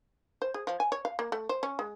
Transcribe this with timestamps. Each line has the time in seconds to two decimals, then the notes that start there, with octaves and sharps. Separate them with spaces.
0.42 C5
0.54 G#4
0.67 F3
0.80 G#5
0.92 C#5
1.05 F5
1.19 A#3
1.32 A3
1.49 C5
1.63 C#4
1.79 G#3